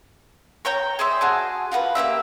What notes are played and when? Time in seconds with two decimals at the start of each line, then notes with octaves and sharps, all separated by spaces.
0.65 C#5 G5 A#5
0.99 G#4 C5 D5 E5
1.21 F#4 G#4 A5
1.72 F4 F#4 A4 B4
1.95 A#3 C4 G4 E5